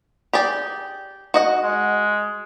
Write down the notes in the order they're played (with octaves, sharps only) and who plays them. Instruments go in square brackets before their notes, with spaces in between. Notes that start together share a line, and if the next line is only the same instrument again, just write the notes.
[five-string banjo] G4 G#4 D5
F#4 D#5 F#5
[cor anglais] G#3